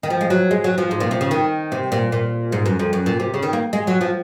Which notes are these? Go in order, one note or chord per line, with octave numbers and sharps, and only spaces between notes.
D#3
F3
G#3
F#3
G#3
F#3
F3
G#2
A#2
C3
C#3
D#3
C3
A#2
A#2
G#2
F#2
F2
F#2
A#2
C3
C#3
D#3
A#3
G#3
F#3
F3